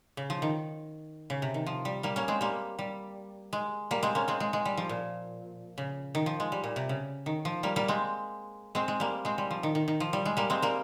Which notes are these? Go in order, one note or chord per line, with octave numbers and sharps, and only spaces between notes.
C#3
F3
D#3
C#3
C3
D#3
F3
G3
G3 A#3
A#3 C#4
G#3 C4
G3 A#3
G3
G#3
G3 A#3
G#3 C4
A#3 C#4
G#3 C4
G#3
G#3
G3
F3
A#2
C#3
D#3
F3
G#3
G3
A#2
C3
C#3
D#3
F3
G3 A#3
G3 A#3
G#3 C4
G#3 C4
G#3
G3 A#3
G#3 C4
G3
F3
D#3
D#3
D#3
F3
G3
G#3
G3 A#3
G#3 C4
G3 A#3